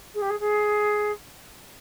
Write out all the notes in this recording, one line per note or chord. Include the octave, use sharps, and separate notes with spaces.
G#4
G4
G#4
G#4